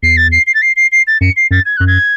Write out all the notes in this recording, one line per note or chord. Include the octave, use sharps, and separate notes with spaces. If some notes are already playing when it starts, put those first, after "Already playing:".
E2 C7
A6
C7
C7
A6
C7
C7
C7
A6
F#2 C#7
C7
F#2 A6
G#6
F#2 F#6
G#6